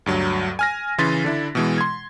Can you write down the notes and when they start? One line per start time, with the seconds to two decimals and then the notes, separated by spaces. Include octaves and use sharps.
0.06 D2 G2 F#3
0.59 G#5 F6 A#6
0.98 C#3 E3 C#4 C6 A6 B6
1.24 D3 D4 E4
1.55 B2 E3 G#3
1.78 C6 G#6